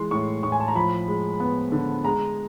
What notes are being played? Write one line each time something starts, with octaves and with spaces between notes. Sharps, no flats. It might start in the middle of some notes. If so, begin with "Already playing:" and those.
Already playing: E3 G#3 C6
A2 C#6
A2 C#6
G#5
A5
A#5
F3 B5
G#3
B3
D3
G#3 A#5